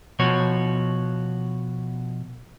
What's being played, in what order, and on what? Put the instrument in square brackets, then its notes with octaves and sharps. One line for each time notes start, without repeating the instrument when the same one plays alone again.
[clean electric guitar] B2 F3 F#4 C#5